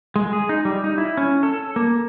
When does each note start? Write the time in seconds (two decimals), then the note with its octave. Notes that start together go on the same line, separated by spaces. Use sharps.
0.16 G#3
0.33 G#4
0.49 D#4
0.65 G3
0.84 D#4
0.98 E4
1.17 C#4
1.43 A4
1.76 A#3